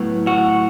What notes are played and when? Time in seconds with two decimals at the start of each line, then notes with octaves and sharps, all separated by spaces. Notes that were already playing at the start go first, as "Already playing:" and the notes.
Already playing: A2 F#3 B3
0.27 F#4